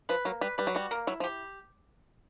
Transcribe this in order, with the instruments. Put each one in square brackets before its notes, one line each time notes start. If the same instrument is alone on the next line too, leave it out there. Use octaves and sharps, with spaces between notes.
[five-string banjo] F3 [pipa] B4
[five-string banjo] F#3 [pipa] A#3
[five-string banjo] G3 [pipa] B4
[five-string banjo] G3 [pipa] B4
[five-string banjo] F#3
[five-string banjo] G3 [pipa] F#4
[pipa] A#3
[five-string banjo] F#3 [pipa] E4
[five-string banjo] F3
[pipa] G4